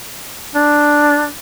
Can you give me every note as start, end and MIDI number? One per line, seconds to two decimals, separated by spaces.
0.55 1.26 62